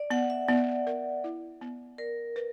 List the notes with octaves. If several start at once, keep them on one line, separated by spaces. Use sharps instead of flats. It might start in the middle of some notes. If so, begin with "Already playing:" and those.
Already playing: D5
B3 F#5
E5
B3 D5
A#4
E4
B3
A#4 D5
B4